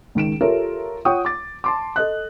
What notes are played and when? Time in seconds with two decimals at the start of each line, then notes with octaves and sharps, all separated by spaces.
0.15 C#2 D#3 D7 E7
0.41 F4 G4 A4 A#4 C#5 E5
1.05 F4 C#5 F#5 G5 C#6 D#6
1.25 D6 A6
1.64 A5 C6 D6
1.96 A4 D#5 F#6